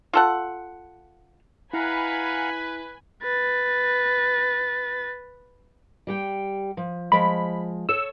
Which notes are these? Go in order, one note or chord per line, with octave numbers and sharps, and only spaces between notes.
F4 A4 F#5
E4 B4 F5 F#5 G#5 A#5 B5
B4 A6
G3 G4 G5
F3
F3 G#3 B5
A4 C#5 E6